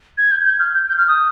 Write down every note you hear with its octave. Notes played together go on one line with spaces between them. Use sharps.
G#6
G6
G6
F6
G6
G6
F6
D#6